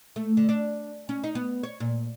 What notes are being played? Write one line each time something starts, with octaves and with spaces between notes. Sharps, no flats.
A3
D3
D4
C#4
D#4
B3
C#5
A#2